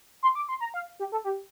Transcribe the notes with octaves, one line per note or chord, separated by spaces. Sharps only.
C6
D6
C6
A#5
F5
G4
A4
G4